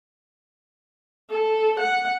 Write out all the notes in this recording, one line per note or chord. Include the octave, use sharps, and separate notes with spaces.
A4
F#5